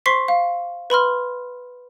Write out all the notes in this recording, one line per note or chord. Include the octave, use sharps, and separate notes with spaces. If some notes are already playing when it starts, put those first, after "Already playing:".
C5 C6 C#6 B6 C7
F5
B4 B5 C6 F6